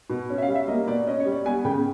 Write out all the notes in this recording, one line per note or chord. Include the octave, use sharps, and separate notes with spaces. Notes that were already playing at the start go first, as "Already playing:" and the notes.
B2
C#4
E5
F5
G3
E5
A#3 D#5
B2 D5
C#4 D#5
C#5
G3
D5
B3 G#5
C#3 G5